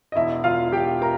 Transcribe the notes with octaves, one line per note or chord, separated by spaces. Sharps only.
D#5
E1 E4 E5
E1 F4 F5
E1 G4 G5
A#4 A#5